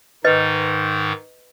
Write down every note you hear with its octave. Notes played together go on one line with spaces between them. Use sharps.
G#2 D#3 D#4 B4 D#5